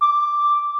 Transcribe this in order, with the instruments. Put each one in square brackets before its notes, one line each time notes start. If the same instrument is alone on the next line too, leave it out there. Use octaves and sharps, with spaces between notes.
[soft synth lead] D6